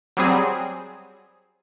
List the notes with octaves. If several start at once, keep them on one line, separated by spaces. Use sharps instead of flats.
F#3 G3 C4 G#4